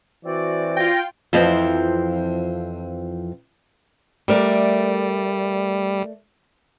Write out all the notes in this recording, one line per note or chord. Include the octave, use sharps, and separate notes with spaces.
E3 C4 F#4 D5
F4 G5 A#6
F2 E3 F3 C4
G3 A3 A#4 D5